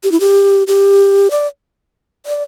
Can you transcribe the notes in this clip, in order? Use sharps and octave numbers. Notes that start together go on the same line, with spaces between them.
G4
E4
G4
G4
D5
D5